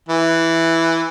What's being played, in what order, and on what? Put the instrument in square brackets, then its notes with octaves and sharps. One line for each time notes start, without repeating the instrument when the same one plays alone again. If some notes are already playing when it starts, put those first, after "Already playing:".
[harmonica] E3